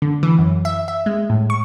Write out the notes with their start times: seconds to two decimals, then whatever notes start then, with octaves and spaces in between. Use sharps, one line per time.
0.02 D3
0.23 E3
0.39 F#2
0.65 E5
0.88 E5
1.06 G#3
1.30 A2
1.50 C#6